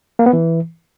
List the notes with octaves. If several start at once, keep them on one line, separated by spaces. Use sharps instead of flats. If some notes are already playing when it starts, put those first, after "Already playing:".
A#3
B3
E3